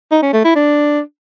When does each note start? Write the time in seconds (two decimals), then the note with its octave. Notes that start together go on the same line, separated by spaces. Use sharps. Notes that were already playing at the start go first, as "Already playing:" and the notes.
0.11 D#4
0.22 C#4
0.33 A3
0.44 E4
0.55 D4